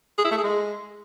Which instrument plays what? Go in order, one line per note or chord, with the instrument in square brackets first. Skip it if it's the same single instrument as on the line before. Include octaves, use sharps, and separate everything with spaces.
[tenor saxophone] G#4
E4
A3
G#4
G#3